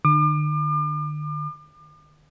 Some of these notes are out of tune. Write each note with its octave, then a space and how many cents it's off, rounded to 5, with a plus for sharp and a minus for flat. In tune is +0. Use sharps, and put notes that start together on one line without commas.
D3 +40 D6 +40